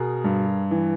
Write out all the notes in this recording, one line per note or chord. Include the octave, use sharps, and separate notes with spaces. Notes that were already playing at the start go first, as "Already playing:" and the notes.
Already playing: B2 G#4 A#4
G2
E3